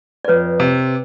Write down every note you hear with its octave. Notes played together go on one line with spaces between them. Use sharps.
D5
F2 B4 C#5
C3